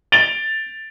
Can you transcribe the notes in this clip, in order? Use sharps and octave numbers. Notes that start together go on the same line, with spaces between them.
A6 D7 F7 G7